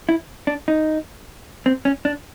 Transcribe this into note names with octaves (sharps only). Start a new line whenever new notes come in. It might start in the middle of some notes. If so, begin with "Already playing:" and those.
E4
D4
D#4
C4
C#4
D4